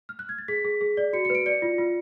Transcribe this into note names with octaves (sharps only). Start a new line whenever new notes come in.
F6
F#6
G#6
A6
G#4 B6
G#4
G#4
D5
F#4 C#7
C#7
B4 D7
D5 C#7
F4
F4